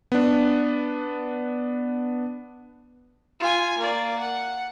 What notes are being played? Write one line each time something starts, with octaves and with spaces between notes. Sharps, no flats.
B3 D4
F4 G#5
A#3 D5
F#5